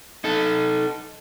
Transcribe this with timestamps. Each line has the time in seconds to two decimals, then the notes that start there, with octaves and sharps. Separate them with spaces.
0.24 D#4 A4